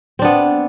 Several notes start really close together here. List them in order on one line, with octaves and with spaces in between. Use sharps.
C4 D4 B3